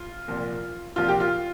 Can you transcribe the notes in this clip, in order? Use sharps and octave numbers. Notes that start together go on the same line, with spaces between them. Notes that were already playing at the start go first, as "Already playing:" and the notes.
Already playing: F4
C2 A#2 F3
C2 A#2 F3 F4
G4
F4